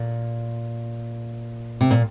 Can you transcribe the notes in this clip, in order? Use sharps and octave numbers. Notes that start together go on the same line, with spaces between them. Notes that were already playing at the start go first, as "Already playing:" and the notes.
Already playing: A#2
C3
A#2